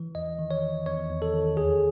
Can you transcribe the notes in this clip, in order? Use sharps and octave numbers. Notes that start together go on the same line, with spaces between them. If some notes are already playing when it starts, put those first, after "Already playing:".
Already playing: E3
E2 D#5
D#3
C#5
E2
E2 C#5
E2
A4
D#3
D#2 G#4